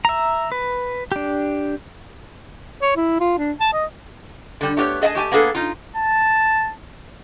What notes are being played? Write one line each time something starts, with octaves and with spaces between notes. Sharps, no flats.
E5 A#5
B4
D4 G4
C#5
E4
F4
D4
A5
D#5
D3 G3
A3 B3 G4 A4 C#5
G#4 D#5 E5 G#5 A5
A3 G4 G#5 A5
A#3 B3 D4 G#4 A4
D#4 F4
A5